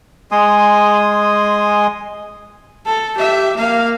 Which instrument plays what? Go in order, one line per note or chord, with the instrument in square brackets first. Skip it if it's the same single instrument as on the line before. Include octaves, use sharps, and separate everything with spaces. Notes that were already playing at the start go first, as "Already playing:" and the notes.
[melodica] G#3 G#5 C6 D#6
[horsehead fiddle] A4
G4 E5
A#3 F5